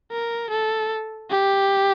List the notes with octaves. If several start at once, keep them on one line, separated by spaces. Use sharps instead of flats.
A#4
A4
G4